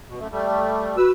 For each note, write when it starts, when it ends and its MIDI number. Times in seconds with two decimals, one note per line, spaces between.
0.08 0.20 47
0.20 0.27 42
0.20 0.27 57
0.32 0.96 55
0.32 0.96 57
0.97 1.11 66
0.97 1.11 71
0.97 1.11 88